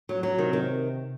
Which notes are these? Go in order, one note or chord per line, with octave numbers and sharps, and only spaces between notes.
F#3
F#3
C3 D#3
D#3